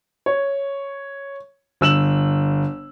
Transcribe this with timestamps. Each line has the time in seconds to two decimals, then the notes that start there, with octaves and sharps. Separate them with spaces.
0.26 C#5
1.81 G1 E6 E7 F#7